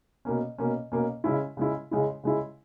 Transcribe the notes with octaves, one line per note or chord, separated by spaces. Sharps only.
B2 A#3 C#4
B2 A#3 C#4
B2 A#3 C#4
C#3 G#3 C#4 E4
C#3 G#3 C#4 E4
C#3 G#3 C#4 E4
C#3 G#3 C#4 E4